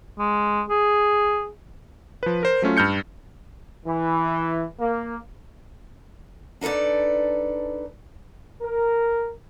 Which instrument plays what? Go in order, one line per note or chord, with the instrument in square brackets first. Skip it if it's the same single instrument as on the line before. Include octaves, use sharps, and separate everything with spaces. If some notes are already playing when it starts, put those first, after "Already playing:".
[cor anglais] G#3
G#4
[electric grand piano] F3 B4
A#4 C5
F#3 A3 C#4 F4
G2 F6 G6 C#7
[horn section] E3
A#3
[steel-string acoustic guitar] D4 D#4 A4 B4 D5
[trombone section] A#4